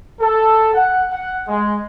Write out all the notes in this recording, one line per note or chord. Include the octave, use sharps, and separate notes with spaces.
A4
F#5
F#5
G#3